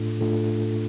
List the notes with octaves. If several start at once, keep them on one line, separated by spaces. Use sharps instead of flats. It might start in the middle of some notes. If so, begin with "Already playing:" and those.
Already playing: A2 A3 D4 F4 A4
A2 A3 D4 F4 A4